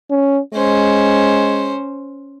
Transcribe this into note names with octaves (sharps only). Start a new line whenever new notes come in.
C#4
G#3 C#4 C5